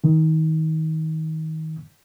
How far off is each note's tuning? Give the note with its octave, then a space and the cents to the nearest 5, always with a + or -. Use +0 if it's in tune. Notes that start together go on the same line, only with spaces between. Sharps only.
D#3 +30